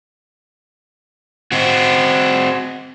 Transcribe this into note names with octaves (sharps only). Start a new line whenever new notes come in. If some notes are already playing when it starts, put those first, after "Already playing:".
C4 F#4